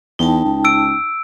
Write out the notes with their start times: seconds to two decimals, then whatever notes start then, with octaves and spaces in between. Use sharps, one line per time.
0.19 E2 D#4 G5 A5
0.45 C#2
0.65 E6 D7